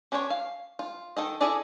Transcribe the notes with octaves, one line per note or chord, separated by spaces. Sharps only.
C#4 D4 A#4 C5 C#5
F5
F4
D#3 A4 D#5
E4 G#4 A4 D5 D#5